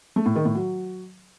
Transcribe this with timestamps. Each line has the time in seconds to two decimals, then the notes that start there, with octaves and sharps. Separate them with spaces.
0.16 A3
0.26 A2
0.36 D#3
0.45 A2
0.55 F#3